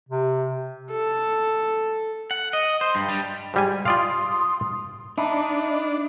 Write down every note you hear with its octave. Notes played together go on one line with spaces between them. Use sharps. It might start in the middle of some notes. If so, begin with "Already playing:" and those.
C3
A4
F#5
D#5
C5
G2
G3
G#2 G3 G#5
F4 D5 F5 C6 D#6
D4 D#4 E5 A5 B5